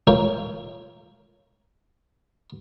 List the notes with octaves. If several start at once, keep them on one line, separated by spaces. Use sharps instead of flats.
F4 A#4 C#5 G5